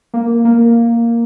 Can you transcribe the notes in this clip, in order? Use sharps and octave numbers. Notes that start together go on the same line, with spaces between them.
A#3
A#3